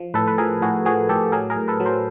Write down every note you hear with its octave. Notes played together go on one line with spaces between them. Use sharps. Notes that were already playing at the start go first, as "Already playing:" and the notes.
Already playing: F3
A2 A4 B4
B4
F3 G#4 A#4
A2 F#4 G#4
F3 F#4 G#4
A2 G4 A4
F#3 G#4 A#4
G#4 A#4
A2
A4 B4
F#3
A#4 C5